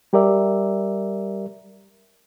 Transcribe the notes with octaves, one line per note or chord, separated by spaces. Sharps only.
G3 G4 A#4 D5 E5